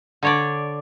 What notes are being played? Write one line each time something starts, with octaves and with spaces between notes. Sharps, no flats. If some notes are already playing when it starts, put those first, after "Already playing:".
D3 C#5 D5